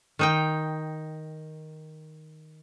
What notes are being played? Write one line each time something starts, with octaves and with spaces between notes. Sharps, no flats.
D#3 D#4 G5